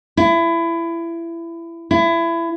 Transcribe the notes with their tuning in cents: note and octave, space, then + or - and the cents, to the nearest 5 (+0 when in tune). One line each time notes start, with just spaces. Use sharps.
E4 +25
E4 +25